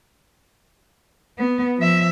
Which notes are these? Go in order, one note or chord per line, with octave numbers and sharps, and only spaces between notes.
B3
F3 E5